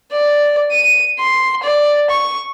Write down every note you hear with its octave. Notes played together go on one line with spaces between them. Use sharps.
D5
D#7
C6
D5
C#6